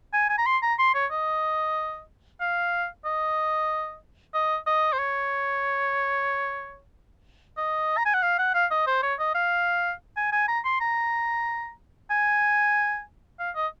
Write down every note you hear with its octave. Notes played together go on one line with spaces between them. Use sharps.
G#5
G#5
A#5
C6
A#5
C6
C#5
D#5
F5
D#5
D#5
D#5
C5
C#5
D#5
A#5
G#5
F#5
F5
F#5
F5
D#5
C5
C#5
D#5
F5
G#5
G#5
A#5
C6
A#5
G#5
F5
D#5